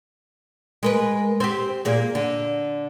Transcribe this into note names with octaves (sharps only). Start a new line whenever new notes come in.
G#3 A#4 B4
C4 G4
A#2 A#3 G#4
D3